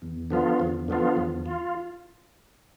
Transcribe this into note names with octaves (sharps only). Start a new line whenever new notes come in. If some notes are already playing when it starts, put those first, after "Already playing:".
E2
D3 F3 B3 F4
E2
D3 F3 B3 F4
E2
F4